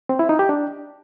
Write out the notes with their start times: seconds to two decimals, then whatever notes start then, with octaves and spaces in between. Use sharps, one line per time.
0.09 C4
0.19 E4
0.29 D#4
0.39 G4
0.49 D4